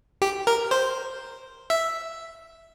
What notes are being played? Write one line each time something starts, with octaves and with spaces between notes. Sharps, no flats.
G4
A#4
C5
E5